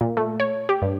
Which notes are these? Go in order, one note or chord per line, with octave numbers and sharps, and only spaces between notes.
A#2
A3
C#5
G4
G2